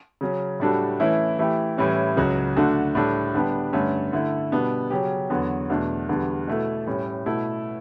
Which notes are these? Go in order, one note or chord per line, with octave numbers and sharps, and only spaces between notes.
C#3 F#3 C#4
A2 G3 D4 F#4 A4
E3 A3 C#4 E4
E3 A3 E4 G4
A2 E3 G3 C#4
C#2 C#3 F#3 C#4 F#4
D3 A3 D4 F#4 A4
A2 G3 D4 A4
D3 G3 B3 D4 G4
G2 D3 A3 C#4
D3 A3 E4
B2 G3 B3 D4
C#3 F#3 C#4 G4
E2 D3 F#3 B3 F#4
E2 B2 A3 D4
E2 D3 G3 D4
B2 A3 E4 A4
A2 G3 C#4
B2 A3 E4 A4